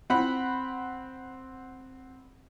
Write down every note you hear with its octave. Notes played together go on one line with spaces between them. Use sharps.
C4 F#5 B5